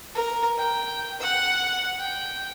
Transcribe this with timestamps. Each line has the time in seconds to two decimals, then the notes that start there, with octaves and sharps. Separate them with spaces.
0.15 A#4
0.58 G5
1.20 F#5
1.99 G5